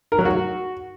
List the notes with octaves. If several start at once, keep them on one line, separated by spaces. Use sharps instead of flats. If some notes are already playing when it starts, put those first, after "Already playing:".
A#4
F#3
F#4